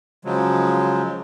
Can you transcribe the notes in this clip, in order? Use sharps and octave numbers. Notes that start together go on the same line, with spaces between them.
C#3 F3 F#3 G#3